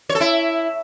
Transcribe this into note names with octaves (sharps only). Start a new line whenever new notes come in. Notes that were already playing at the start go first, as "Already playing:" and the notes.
C#5
A4
E4